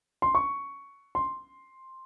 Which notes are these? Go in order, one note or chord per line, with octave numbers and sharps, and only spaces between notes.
C6
C#6
C6